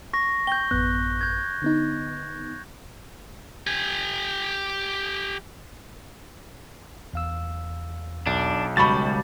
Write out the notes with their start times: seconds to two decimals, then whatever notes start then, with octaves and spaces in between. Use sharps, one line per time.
0.13 C#6 A#6
0.47 G5 G6 G7
0.71 A1 F#2 B3 F#6
1.21 G6 G#6
1.62 D3 B3 D#4
3.67 G4 G#5
7.13 E2 F5 E6
8.27 B1 D4
8.77 C#2 G3 F#4 A5 B5 C#6 A6